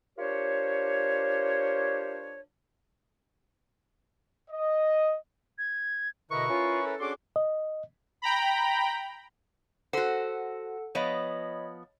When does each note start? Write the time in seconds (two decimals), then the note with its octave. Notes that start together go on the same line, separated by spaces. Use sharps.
0.18 D4 F4 G4 A#4 C5 C#5
4.50 D#5
5.58 G#6
6.31 B2 D3 E4 A#4 B4 D#5 C#6
6.49 C#4 F4
6.86 A4
7.00 C#4 D4 F#4 G#4 C6 D6
7.36 D#5
8.22 G5 A#5 B5
9.93 F#4 A4 C5 F#5
10.95 F3 B3 C#5 D#5 B5